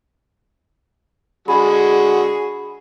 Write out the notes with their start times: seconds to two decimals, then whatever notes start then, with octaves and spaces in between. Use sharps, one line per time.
1.48 D3 G#3 F#4 G#4 B5